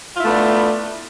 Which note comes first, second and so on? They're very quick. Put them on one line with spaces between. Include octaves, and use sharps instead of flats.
F4 E4 A3 B3 D4